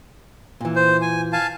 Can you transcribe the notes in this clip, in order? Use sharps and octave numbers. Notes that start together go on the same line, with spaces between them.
A#2 E3
C5
G#5
F5 G#5 A5